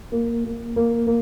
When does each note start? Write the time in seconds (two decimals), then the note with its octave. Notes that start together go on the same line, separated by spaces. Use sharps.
0.12 A#3
0.45 A#3
0.76 A#3
1.07 A#3